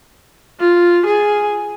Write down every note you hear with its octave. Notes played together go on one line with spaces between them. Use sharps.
F4
G#4